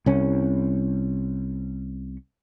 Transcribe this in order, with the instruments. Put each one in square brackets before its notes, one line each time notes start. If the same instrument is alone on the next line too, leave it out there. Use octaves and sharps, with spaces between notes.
[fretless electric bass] C2 C#4